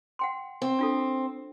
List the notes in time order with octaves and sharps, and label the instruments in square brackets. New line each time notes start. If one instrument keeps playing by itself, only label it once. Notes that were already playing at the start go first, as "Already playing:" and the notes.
[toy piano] F#5 G5 C6
[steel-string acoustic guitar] C4
[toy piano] D4 F4 A4